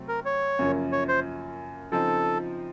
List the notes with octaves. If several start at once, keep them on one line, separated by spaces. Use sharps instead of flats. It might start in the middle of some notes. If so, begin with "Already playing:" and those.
Already playing: C3 F#3 A3 C4
A#4
C#5
F#2 C#3 F3 A#3 C#4
C#5
C5
C#3 F3 C4 D#4 A4